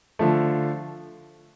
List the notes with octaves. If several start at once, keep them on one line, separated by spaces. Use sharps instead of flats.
D3 F3 A3